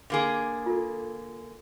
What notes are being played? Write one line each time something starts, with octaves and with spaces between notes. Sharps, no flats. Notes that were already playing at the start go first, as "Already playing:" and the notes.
D3 A#3 G#4
F4 A4